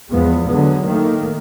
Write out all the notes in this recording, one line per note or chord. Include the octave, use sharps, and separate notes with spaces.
E2 F3 G#3 B3
D3 F#3 G#3 B3
D#3 A3 A#3